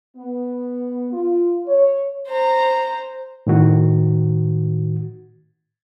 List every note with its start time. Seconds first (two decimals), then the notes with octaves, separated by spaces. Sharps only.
0.16 B3
1.12 F4
1.67 C#5
2.29 C5 A#5
3.47 A2 D#3 F#4